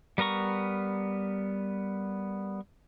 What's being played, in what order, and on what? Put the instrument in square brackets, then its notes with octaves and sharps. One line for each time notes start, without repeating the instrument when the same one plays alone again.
[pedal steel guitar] G3 B3 A#4 A#5 C#6